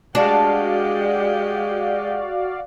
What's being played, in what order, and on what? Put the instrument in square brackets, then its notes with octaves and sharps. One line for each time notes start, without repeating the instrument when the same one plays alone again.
[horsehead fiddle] G#3 G4 [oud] D4 [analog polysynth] F#4 D5 F5